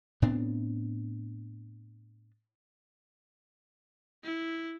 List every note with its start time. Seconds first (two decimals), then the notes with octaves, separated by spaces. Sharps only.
0.22 A2 B3 C4 D4
4.24 E4